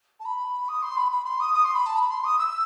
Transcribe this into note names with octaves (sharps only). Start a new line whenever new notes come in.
A5
B5
D#6
C6
B5
B5
C6
D#6
D#6
C6
B5
A5
B5
C6
D#6
E6